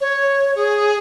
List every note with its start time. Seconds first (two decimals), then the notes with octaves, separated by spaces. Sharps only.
0.01 C#5
0.55 G#4